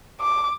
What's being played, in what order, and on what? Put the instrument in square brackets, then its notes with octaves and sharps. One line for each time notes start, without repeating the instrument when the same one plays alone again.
[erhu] D6